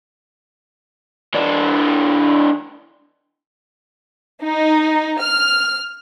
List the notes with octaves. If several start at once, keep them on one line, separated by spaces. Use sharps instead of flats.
E3 D4
D#4
F6